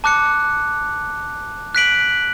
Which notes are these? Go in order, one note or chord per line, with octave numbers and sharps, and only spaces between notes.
A5 D6 F#6 C#7
F#6 B6 D7 F#7